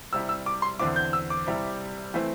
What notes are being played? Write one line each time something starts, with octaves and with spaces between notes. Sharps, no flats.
C3 G3 E4 E6
E6
D6
C6
E2 D3 C4 E4 D6
G6
E6
D6
C3 G3 E4
E3 A3 C4 E4